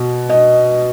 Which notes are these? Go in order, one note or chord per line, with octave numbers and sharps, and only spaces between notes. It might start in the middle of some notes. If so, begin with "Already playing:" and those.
Already playing: B2
D#5